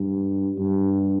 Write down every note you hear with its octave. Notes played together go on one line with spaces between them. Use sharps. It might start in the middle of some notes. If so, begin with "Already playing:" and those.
Already playing: G2
G2